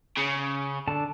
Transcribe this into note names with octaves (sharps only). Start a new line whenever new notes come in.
C#3
D3 A5